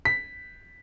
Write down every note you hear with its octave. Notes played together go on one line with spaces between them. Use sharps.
B6